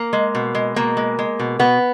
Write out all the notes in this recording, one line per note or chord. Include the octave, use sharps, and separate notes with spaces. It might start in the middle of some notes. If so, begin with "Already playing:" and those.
Already playing: A#3
G#3
B2
G#3
B2 A#3
G#3
G#3
B2
B2 B3